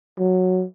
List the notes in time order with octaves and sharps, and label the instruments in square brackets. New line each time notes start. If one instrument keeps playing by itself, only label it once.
[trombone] F#3